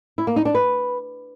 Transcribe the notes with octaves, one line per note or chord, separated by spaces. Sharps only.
E4
A#3
D#4
D4
B4